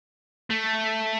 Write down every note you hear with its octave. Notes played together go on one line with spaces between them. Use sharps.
A3